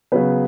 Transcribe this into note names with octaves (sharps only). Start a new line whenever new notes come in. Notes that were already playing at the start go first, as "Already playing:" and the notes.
C#3 F#3 B3 B4